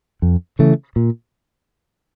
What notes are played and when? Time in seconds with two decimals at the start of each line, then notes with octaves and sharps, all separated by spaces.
0.22 F2
0.59 C#3 E3 A3
0.96 A#2